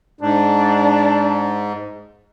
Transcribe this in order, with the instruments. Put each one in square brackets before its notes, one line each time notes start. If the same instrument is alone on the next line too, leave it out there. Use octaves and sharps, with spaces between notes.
[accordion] G#2 [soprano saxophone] D4